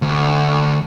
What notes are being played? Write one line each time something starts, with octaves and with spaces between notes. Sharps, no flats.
D2